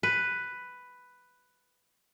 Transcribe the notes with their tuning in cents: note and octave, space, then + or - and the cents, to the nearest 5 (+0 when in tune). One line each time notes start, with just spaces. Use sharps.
B4 +5